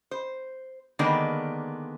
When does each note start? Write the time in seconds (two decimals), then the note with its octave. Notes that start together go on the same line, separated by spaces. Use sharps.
0.11 C5
0.99 D3 D#3 G#3 A#3 B3 D5